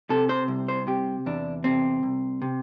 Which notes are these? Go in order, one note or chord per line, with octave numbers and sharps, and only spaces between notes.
C3 A4
C5
C2
C5
C3 G4
E2 D4
C3 C4
C2
C3